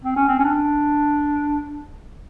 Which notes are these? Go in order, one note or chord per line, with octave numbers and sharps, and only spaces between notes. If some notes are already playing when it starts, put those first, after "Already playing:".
C4
C#4
C4
C#4
D4